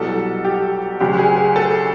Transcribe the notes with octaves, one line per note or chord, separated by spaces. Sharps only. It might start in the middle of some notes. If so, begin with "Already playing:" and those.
Already playing: C2 B2 F#3 A4
G4
D2 C#3 F#3 G4
G#4
G#4
A4